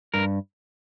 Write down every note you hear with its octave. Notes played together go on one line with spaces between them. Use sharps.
G2 A#4